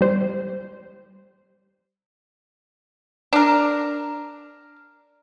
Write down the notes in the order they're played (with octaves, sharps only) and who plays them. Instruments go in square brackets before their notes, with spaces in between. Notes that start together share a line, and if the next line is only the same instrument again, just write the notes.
[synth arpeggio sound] G3 C5
[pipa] D4 A#4